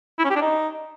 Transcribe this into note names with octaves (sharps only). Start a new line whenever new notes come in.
E4
C#4
G4
D4
D#4